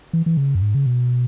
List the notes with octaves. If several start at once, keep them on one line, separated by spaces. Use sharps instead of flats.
E3
E3
C#3
F#2
G#2
C#3
B2